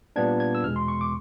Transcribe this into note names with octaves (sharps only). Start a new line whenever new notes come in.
A#2 G3 B3 D4 G#6
G#6
E6
E2 B2 G#3 F6
C6
C#6
D6